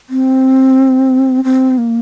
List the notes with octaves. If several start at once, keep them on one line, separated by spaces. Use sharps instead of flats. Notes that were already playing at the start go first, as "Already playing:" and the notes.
C4
C4
A#3